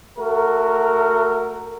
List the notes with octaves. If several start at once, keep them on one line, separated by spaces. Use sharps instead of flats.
A3 F#4 A#4